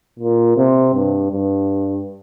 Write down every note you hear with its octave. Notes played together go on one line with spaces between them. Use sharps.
A#2
C3
G2
G2